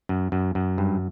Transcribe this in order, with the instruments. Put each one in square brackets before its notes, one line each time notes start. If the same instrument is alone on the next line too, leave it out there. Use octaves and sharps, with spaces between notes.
[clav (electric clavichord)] F#2
F#2
F#2
G2